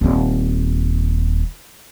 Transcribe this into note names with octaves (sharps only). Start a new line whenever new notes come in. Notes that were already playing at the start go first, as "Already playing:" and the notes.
D#1 C4